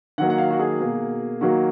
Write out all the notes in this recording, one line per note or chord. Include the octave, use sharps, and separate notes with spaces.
D#3 F#3 A#3 F#5
F#5
F5
F#4
G#4
B2 A#3
D#3 F#3 A#3 F#4